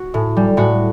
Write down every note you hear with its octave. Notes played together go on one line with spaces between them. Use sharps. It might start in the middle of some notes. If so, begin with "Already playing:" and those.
Already playing: F#4
A2
G3
A2 F#4